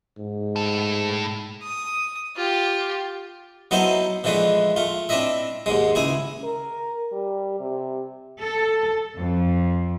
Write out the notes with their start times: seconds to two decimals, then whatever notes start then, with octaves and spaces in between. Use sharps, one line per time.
0.18 G#2
0.56 A2 A4
1.63 D#6
2.36 F4 G4
3.71 F#3 B3 D#4 E4 A4 C5
4.24 D3 E3 F3 G#3 A3 B4
4.76 A3 F4
5.09 C4 D4 E4 D#5 E5
5.66 D#2 G#2 G#3
5.95 C#2 E4 G#4 G#5
6.44 A#4
7.12 G3
7.60 C3
8.40 A4
9.16 F2